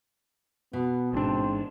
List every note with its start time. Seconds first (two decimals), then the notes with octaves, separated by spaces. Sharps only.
0.73 B2 B3
1.13 A1 G#2 C4 D4